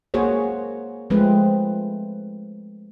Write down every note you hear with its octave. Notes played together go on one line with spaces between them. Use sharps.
A#3 F#4 G#4 C5 C#5
F3 G#3 A3 C4 B4